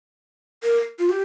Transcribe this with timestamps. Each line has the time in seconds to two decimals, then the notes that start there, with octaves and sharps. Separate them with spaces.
0.63 A#4
0.99 F4
1.09 G4